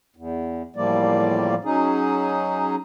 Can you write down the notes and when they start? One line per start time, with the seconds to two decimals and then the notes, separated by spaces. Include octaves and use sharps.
0.16 E2
0.76 E2 A2 F3 G3 A#3 D5
1.65 F#3 C#4 D#4 G#4